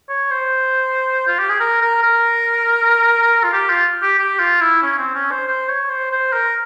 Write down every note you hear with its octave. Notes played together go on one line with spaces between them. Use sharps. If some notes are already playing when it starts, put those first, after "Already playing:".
C#5
C5
F4
G4
G#4
A#4
A#4
A#4
F4
G4
F4
G4
G4
F4
E4
C#4
C4
C#4
C5
C5
C#5
C5
C5
A#4